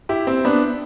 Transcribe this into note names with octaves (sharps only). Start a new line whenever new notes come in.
E4 G4
C4 E4
B3 D4